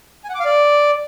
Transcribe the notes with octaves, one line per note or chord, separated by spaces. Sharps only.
G#5
F#5
D6
F5
D5